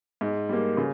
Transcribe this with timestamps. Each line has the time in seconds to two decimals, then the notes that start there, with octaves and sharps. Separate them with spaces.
0.21 G#2
0.49 G3 A#3
0.77 C#3